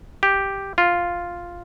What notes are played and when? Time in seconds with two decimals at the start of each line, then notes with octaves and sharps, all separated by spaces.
0.23 G4
0.78 F4